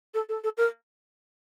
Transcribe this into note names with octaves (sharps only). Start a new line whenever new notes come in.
A4
A4
A4
A#4